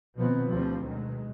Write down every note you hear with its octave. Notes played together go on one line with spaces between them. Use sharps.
B2 D#3 F3 B3 C4
D2 E3 F3 G3 C4
B2 D#3 F#3 G#3